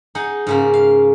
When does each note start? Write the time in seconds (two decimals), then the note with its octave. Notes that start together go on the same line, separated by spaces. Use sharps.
0.15 D#4 G#4 F#5
0.47 G#2 C#3 A#3
0.74 F5